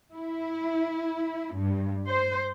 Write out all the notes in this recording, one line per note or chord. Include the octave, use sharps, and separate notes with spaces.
E4
G2
C5